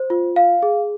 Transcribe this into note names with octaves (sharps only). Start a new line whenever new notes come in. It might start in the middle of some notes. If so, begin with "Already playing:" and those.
Already playing: C5
F4
F5
G#4